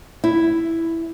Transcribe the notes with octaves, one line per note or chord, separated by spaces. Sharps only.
E4